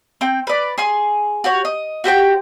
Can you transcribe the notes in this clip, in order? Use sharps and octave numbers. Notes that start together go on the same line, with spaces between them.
C4 G5
B4 D5
G#4 G#5 C6
F#4 G4 C#5
D#5
F#4 G4 C5 G5